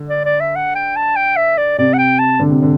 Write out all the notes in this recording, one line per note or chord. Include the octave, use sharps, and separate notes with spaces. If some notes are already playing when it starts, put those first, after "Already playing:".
Already playing: D3
D5
D5
E5
F#5
G5
A5
G5
E5
D5
C3 D5
F#5
G5
A5
D3
C3
D3